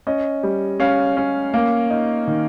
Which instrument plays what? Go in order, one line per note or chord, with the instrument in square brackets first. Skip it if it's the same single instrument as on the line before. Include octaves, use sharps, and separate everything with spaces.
[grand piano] C#4 D#5
G3
C#4 F5
C#4
A#3
D#4
D#3